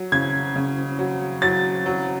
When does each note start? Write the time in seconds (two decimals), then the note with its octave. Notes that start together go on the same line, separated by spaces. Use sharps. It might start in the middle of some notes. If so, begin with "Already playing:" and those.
Already playing: F#3
0.12 C#3 G#6
0.56 C#3
0.99 F#3
1.42 F#3 A6
1.86 F#3